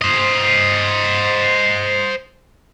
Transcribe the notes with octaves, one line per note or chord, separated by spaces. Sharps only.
C5 D#5